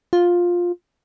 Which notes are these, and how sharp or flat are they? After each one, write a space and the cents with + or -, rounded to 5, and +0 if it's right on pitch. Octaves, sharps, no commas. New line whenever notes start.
F4 +10